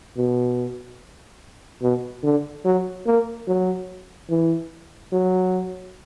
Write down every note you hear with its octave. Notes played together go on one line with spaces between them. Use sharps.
B2
B2
D3
F#3
A#3
F#3
E3
F#3